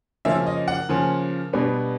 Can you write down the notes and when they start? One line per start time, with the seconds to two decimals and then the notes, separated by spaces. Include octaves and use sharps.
0.25 C#3 F3 A#3 C#4 E5
0.46 D#5
0.68 F#5
0.89 C#3 F3 A#3 C#4
1.53 B2 G3 B3 D4